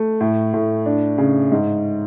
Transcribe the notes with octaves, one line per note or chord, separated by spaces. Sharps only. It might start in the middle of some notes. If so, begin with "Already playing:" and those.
Already playing: A3
A2
A2
D4
C#3
G#2